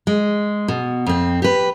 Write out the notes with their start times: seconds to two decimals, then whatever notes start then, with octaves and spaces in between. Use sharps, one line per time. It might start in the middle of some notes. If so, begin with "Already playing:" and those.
0.07 G#3
0.68 B2
1.07 F2 C4
1.42 G4 B4